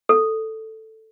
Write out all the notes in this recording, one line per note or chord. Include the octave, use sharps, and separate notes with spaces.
A4